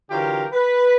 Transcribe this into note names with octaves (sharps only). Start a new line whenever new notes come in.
D3 E3 F#3 F4 G4 A#4
B4